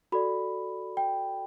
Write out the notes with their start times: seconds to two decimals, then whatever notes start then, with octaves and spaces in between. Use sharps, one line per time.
0.12 F#4 A4 D5 B5
0.97 G5